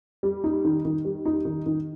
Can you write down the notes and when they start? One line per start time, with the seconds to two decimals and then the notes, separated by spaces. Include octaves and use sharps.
0.23 G3
0.44 D#4
0.64 D#3
0.85 D#3
1.05 G3
1.25 D#4
1.45 D#3
1.66 D#3